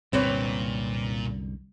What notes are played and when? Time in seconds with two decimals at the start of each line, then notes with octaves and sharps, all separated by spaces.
0.13 C2 F#2 A#2 D3 C4 B4 C#5